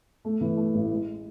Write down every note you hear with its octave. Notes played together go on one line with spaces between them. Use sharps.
A3
E3
A3
A1
G#3